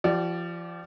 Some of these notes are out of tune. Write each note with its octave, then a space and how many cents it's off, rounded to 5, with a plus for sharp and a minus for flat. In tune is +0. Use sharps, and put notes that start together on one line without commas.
F3 -35 G4 -45 D5 +0